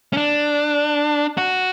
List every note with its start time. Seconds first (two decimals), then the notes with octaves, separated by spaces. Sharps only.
0.13 C#4
0.17 D4
1.37 F#4